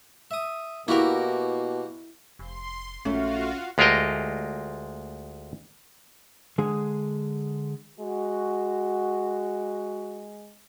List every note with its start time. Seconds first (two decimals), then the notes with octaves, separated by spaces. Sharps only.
0.31 E5 D#6
0.88 B2 A#3 E4 F#4 G4 A#4
2.39 F1 C6
3.05 A#1 A3 A#3 C#4 F4 F#4 F5
3.78 D2 G#3 F4 G4 A#4 D#5
6.58 D3 G#3 G#4
8.00 G#3 F#4